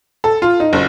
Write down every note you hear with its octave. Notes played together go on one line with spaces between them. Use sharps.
A4
F4
D#4
F#1